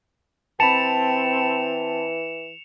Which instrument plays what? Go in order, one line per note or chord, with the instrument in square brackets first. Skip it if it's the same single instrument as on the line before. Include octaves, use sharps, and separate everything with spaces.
[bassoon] E3 [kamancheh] C4 [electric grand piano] A5 B5 [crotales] C#7 E7 F7